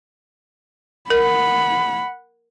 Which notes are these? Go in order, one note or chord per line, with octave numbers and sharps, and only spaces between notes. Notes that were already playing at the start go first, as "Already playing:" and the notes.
A#4 F#5 B5